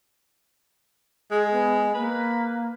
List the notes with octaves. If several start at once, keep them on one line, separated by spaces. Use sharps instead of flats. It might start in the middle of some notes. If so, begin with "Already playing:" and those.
G#3 G#4
B3
A#3 B4